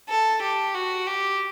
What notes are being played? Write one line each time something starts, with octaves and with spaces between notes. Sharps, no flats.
A4
G4
F#4
G4